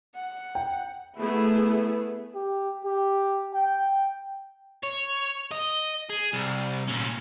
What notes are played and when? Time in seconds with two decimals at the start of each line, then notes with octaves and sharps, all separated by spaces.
0.15 F#5
0.55 G5
1.19 A3 B3 E4 G#4
2.35 G4
2.85 G4
3.54 G5
4.83 C#5
5.51 D#5
6.10 G#4
6.34 C2
6.88 A#2 C#4